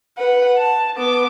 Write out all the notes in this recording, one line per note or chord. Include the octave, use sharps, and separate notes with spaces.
B4 F#5
A5
B3 D6